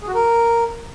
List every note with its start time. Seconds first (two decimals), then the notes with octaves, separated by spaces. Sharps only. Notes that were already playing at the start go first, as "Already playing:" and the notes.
0.01 G#4
0.08 F#4
0.14 A#4